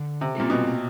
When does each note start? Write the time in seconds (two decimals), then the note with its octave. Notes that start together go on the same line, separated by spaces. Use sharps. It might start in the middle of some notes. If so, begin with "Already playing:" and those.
Already playing: D3
0.21 C3
0.35 A#2 G3 C4 F4 A4
0.50 B2